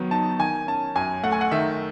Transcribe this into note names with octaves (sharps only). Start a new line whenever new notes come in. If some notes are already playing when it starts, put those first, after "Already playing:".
Already playing: D#3 F#3 B3
D#4 A5
D#3 G#5
C#4 A5
F#2 G#5
A3 F#5
G#5
F#5
D#3 E5